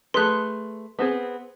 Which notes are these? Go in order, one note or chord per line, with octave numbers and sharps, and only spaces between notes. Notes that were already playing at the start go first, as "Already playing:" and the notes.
A3 G#4 B4 C6 F#6
B3 C4 G#4